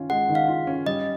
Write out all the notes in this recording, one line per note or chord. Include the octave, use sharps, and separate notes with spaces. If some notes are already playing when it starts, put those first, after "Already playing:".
Already playing: D#3 C#4 F4
G#3 F#5
D#3
F5
F4
C#4
G3 D#5